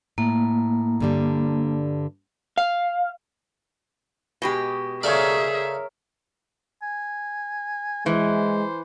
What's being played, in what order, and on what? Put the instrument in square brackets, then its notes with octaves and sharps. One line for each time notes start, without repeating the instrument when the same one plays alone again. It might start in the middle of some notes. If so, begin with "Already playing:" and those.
[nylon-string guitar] A2 [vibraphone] A#3
[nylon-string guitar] G2 D3 G3
[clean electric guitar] F5
[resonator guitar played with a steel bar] B2 G#3 G4
[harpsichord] C#3 A3 D5 [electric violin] G#4 E5 [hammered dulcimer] A#4 C#5
[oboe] G#5
[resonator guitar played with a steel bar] E3 [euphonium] G#3 [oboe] C5